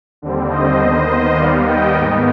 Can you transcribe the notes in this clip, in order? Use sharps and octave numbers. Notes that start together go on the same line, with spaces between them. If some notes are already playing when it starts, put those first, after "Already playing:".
D#2 D3 G3 C4
C5 D#5
D#2 D#3 B3 C5 D#5
D#2 D#3 G3 B3 D5 F5
D#5 G5
G#2 D#3 B3